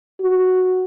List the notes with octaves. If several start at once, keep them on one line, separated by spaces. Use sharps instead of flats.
F#4